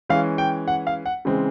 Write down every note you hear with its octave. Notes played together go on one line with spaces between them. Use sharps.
E3 G#3 C#4 F5
G5
F#5
F5
F#5
C#3 E3 G#3 C4